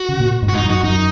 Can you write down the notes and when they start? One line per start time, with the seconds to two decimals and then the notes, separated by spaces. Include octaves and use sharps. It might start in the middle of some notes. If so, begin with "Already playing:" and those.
Already playing: F#4
0.09 C#3
0.20 A#2
0.42 G#2
0.49 F#4
0.54 G#2 D#4
0.63 F#2
0.70 F#4
0.83 F#2 D#4